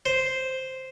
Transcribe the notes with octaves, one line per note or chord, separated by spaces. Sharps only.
C5